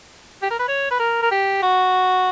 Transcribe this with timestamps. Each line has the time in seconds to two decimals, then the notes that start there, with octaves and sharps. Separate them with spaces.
0.42 G4
0.51 A#4
0.59 B4
0.68 C#5
0.91 B4
0.99 A#4
1.22 A#4
1.31 G4
1.63 F#4